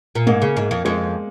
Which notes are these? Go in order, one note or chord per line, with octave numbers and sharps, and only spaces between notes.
A#2
G#2 A#3
C#3
G#2
F2
F2 G#3